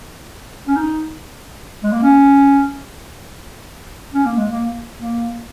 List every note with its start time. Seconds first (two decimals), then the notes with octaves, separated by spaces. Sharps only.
0.68 C#4
0.76 D#4
1.83 G#3
1.92 A#3
2.03 C#4
4.13 C#4
4.25 A#3
4.37 G#3
4.49 A#3
4.98 A#3